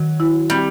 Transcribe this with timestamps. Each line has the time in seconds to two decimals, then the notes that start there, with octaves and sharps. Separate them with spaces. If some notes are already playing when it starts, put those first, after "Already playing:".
Already playing: D#3 F#3
0.20 E4
0.50 G3 C4